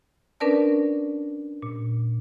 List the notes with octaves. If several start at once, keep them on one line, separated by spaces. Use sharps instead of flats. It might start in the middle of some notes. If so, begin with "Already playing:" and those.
C#4 D4 A#4 B4 D5 A5
A#2